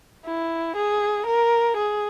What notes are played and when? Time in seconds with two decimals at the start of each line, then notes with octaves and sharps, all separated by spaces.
0.25 E4
0.76 G#4
1.26 A#4
1.77 G#4